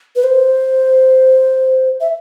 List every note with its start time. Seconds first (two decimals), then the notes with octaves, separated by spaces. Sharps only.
0.16 B4
0.24 C5
2.01 E5